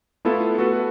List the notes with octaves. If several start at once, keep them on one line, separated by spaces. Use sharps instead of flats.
A3 B3 E4 F4 A4
F#4 A4 B4